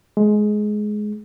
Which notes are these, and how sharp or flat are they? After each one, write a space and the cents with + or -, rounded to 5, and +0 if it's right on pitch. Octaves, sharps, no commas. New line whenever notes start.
G#3 +15